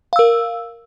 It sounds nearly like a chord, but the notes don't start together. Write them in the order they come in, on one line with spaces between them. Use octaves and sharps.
F5 E6 A#4